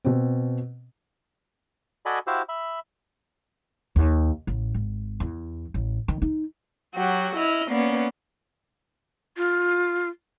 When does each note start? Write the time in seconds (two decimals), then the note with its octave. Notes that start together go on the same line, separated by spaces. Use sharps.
0.05 B2 C4
2.06 F#4 A4 D5 D#5 G#5 B5
2.27 E4 F#4 G4 C5 F5 E6
2.49 E5 B5
3.96 D#2
4.47 A1
4.74 G#1
5.20 E2
5.74 A1
6.08 D#3
6.22 D#4
6.96 F#3 F#4 G4
7.37 E4 D#5 F6
7.70 A#3 B3 C#4 D5
9.37 F4